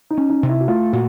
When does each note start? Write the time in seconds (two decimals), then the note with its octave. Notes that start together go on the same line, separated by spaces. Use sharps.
0.10 D#4
0.17 C#4
0.30 D#4
0.43 C3
0.49 E4
0.61 F#4
0.68 A3 F4
0.93 A#2 F#4